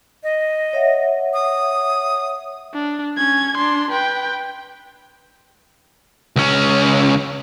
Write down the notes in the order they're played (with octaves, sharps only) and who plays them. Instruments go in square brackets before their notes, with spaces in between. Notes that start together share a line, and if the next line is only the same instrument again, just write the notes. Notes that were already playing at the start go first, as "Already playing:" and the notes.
[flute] D#5
[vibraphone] C#5 E5 F#5
[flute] D#6
[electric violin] D4
C#4 G#6
D4 C6
B4 G5
[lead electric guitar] C#2 C#4